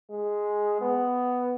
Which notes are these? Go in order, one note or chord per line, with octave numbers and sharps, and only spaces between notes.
G#3
B3